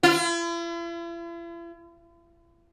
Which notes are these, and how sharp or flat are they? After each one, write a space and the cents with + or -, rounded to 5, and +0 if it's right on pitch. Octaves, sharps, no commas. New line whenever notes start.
E4 +45